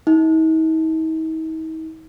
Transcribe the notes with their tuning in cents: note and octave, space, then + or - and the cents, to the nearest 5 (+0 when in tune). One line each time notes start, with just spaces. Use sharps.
D#4 +45